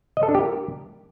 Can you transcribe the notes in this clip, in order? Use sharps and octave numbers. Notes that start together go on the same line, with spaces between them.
D#5
A4
D4
G4
A#4